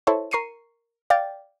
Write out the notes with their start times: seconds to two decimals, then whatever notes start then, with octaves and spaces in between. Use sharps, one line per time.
0.07 E4 A4 C5 C#5
0.31 A#4 C#6 C7 C#7 D#7
1.10 D5 F5 G5 A6